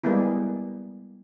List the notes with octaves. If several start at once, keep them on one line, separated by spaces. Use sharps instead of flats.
G3 G#3 A#3 B3 E4